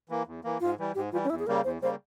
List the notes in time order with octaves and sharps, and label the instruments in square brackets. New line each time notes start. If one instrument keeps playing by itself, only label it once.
[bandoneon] E3 A#3
E2
E3 A#3
[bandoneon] G#2 [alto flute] F4
[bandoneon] E3 G3
[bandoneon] G#2 [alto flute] G4
[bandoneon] E3 G3 [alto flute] F4
[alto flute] C#4
[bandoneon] E2 [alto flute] E4
[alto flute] G#4
[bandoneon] C#3 G3 A#3 [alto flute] A#4
[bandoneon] E2 [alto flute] C5
[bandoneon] C#3 G3 A#3 [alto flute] C5